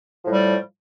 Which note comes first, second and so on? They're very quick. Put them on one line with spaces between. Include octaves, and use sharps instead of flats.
F3 A2 G3